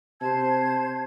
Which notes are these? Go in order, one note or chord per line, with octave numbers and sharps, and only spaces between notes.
C3 C5 A5 G#6